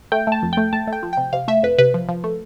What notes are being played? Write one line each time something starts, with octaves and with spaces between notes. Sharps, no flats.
A3 G5
A3 A5
F2
A3 G5
A3 A5
A3
G5
F3
C3 G5
C3 F5
A3 E5
F2 B4
C3 B4
F3
F3
A3